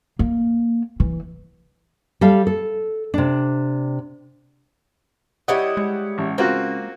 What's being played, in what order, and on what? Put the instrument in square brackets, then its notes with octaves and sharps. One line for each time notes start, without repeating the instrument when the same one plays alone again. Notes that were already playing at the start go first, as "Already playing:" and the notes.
[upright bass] A#3
E3
[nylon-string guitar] G3 A4 F5
A4
C3 D4
[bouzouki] G3 E4 D#5 [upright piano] G4 C#5 F#5
[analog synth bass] G#3
[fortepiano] A1
[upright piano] C#3 [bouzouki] A#3 [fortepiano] C4 F4 F#4